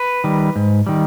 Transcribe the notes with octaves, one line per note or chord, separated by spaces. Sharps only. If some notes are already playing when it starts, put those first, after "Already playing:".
Already playing: B4
D#3 G3
G#2
D#3 G3